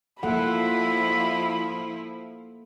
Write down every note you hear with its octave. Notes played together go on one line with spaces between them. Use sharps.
F3 A#3 E4 A4 F#5 B5